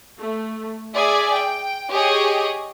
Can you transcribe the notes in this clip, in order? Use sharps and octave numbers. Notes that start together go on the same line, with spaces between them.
A3
G#4 D5 E5 G#5
G5
G4 G#4 C#5 D#5